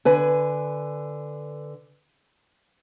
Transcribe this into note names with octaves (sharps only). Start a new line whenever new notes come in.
D3 B4 G#5